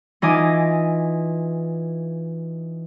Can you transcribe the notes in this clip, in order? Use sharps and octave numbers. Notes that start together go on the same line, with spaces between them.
E3 D#4 F4 D#5 G#5 D6